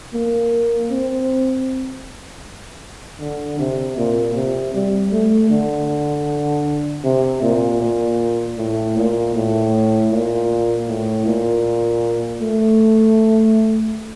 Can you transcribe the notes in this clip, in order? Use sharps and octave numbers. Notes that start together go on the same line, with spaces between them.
A#3
C4
D3
C3
A#2
C3
G3
A3
D3
C3
A#2
A#2
A2
A#2
A2
A#2
A2
A#2
A3